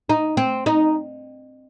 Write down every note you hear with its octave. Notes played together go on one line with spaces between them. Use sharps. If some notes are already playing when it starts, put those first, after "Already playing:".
D#4
C4
D#4